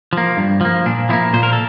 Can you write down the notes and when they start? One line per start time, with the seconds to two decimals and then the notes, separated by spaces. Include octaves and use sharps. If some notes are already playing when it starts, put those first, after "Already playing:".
0.13 F3 A#3
0.37 G2
0.61 F3 A#3
0.86 A#2 D4
1.09 F3 C4 E4
1.13 A#3
1.33 A#2 C5
1.43 A#4
1.53 A4